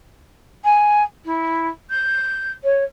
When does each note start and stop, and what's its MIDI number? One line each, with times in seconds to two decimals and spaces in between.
0.64 1.02 80
1.25 1.68 64
1.90 2.52 91
2.64 2.83 73